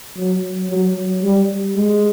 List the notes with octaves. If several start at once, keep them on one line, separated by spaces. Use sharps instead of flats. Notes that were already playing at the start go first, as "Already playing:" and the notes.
F#3
F#3
G3
G#3